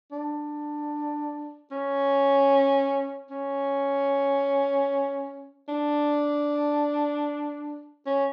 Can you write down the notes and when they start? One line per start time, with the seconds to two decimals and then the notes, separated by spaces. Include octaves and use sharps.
0.12 D4
1.71 C#4
3.30 C#4
5.68 D4
8.07 C#4